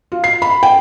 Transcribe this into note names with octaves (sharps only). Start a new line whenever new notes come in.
F4
C7
B5
G5